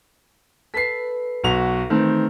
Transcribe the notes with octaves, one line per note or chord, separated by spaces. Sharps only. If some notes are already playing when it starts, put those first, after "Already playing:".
A4 B4 E6 B6 C7
B1 F#4 F7
D#3 E3 A3 C4